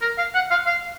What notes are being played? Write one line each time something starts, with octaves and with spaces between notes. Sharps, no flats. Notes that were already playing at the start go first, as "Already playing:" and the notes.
A#4
F5
F#5
F5
F5